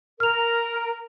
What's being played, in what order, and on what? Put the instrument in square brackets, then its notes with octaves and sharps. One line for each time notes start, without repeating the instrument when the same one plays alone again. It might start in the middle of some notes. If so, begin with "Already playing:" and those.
[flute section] A#4 [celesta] F6 F7